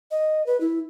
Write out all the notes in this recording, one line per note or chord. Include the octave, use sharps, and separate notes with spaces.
D#5
B4
E4